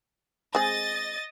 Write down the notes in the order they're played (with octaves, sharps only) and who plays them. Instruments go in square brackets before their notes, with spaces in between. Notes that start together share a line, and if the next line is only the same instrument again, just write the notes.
[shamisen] G#3 C4 G#4 [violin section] D#5 A6